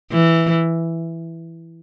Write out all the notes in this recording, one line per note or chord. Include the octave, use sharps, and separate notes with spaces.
E3